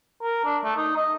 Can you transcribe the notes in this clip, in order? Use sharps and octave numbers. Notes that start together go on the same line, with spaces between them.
A#4
D4
A3
D#4
D#5